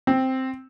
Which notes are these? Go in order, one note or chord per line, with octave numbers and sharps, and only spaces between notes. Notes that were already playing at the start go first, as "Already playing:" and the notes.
C4